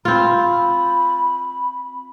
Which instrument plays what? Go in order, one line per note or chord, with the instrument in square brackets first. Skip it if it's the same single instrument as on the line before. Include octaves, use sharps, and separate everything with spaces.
[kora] C4 F4 [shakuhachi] B5